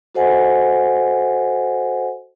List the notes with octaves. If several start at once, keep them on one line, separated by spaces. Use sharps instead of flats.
F#4 A4 C5 D#5 F#5 G#5